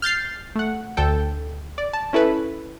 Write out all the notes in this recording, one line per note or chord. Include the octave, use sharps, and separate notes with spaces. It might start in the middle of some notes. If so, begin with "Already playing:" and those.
F6 G6 A6 C7
A3 F#5
D2 D3 A4 G5
D5
A5
C#4 E4 A4 B4